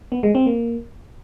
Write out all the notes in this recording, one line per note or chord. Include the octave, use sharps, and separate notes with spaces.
B3
G#3
C4
A#3